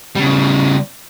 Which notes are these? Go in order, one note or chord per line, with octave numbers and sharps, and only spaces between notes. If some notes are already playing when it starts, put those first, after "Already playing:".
C#3 G3